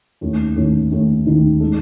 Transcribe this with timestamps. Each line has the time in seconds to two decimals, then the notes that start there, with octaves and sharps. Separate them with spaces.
0.21 D#2 D#3 A3 C#4
0.56 D#2 D#3 A3 C#4
0.91 D#2 D#3 A3 C#4
1.26 D#2 D#3 A3 C#4
1.60 D#3 G#3 D#4 A4